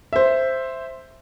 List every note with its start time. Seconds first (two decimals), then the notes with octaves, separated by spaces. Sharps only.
0.13 C5 E5